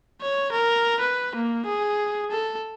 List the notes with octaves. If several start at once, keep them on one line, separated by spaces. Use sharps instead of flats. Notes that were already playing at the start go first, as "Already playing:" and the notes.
C#5
A#4
B4
A#3
G#4
A4